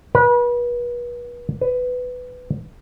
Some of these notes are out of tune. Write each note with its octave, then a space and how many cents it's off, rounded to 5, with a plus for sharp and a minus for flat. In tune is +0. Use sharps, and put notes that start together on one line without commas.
B4 -35
B4 +15